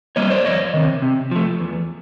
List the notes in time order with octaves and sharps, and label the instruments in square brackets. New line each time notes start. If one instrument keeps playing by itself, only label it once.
[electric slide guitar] G3 A#3 C#5 D#5
C5 D5
F2 C#5 D#5
C3 D#3
C3
F3 A3
E2